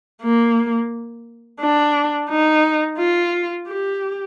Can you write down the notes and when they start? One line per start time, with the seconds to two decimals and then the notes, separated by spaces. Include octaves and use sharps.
0.23 A#3
1.61 D4
2.30 D#4
2.98 F4
3.68 G4